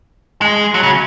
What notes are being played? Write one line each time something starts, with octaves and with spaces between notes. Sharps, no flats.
G#3
F#3
C#3